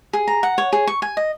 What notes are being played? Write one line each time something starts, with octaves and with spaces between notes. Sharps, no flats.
G#4
A#5
F#5
C#5
G#4
C#6
G#5
D#5